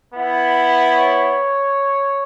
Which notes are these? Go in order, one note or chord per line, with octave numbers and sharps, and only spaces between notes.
B3 E4
C#5